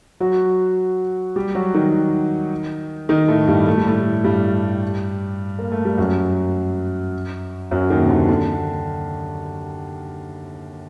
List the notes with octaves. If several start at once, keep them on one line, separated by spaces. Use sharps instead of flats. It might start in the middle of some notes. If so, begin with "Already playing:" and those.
F#3 F#4
G3 G4
F#3 F#4
D#3 D#4
D#3 D#4
A2 A3
G2 G3
A3
G3
A2 A3
G2 G3
A#3
A3
G3
F#2 F#3
F#2 F#3
D#2 D#3
C3
D3
D3